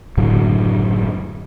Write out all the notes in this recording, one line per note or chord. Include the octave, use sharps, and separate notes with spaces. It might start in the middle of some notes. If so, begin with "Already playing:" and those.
F#1 A2 D3 F#3